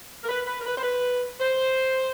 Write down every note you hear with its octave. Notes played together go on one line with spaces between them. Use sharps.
A#4
B4
B4
A#4
B4
C5
B4
C5